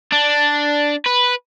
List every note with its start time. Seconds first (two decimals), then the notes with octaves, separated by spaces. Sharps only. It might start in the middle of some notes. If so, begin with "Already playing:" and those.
0.12 D4
1.06 B4